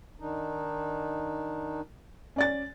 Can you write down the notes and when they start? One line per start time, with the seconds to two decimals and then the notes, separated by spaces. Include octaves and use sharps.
0.20 D#3 D4 D#4
2.36 C#4 D5 A6